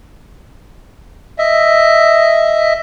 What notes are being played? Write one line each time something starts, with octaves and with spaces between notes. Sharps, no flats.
D#5 E5